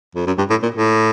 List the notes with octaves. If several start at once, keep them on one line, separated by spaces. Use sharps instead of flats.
F2
F#2
G2
A2
A#2
A2